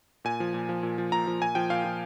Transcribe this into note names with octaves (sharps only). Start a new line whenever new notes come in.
A#2 G#5
F3
A#2
F3
A#2
F3
A#2 A#5
F3
A#2 G#5
F3 G5
A#2 F5
F3